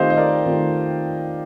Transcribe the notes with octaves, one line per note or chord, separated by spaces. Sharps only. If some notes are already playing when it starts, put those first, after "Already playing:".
Already playing: D#3 A3 C4 F4 G4 C5 D#5 F5
D#5
A#4 D5
D#3 A3 C4 F4